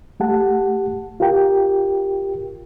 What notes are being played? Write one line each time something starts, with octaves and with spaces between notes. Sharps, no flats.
A3 G4 F#5 A5
F4 G4 A#4 G5